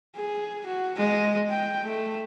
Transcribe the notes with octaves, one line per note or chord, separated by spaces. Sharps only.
G#4
F#4
G#3 D#5
G5
A3